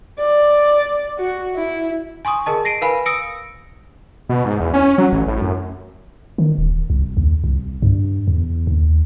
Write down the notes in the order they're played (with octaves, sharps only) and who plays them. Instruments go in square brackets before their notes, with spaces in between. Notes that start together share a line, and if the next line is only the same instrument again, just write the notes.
[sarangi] D5
F#4
E4
[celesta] G#5 C6 C#6 D#6
G#4 A#4 D#5 A5
A#6 C7 D7 D#7
A#4 B4 F5 G#5 B5
D#6 E6 A#6 C#7 D7
[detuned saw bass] B2
G#2
E2
C#4
F#3
A1
A2
F#2
[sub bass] D#3
D#1
C2
D#2
C2
G2
E2
D#2